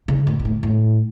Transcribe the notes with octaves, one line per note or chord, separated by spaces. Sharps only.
C#3
A2
B2
A2
A2